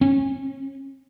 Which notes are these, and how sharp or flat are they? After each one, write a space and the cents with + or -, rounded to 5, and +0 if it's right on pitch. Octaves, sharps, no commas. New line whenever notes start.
C#4 -35